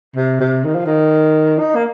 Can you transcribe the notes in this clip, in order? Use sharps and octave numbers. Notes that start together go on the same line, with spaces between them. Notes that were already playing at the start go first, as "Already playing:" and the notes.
C3
C3
D#3
F3
D#3
D#4
A#3